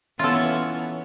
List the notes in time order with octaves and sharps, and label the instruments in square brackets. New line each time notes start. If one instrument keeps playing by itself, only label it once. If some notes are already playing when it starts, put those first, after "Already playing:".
[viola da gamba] E3 B3 C#4 [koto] F4 A4